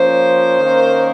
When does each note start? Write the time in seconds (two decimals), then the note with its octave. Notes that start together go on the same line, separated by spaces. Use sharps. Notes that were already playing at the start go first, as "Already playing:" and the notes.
Already playing: F3 A#3 C#4 C5
0.60 D#3 A#3 C#4